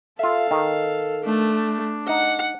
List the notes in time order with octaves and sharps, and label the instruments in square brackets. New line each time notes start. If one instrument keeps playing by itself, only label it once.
[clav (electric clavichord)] F4 E5 [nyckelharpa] A4 F5
[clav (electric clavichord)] D#3
[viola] A3 [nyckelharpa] D4
[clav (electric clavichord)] D#4 [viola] F#5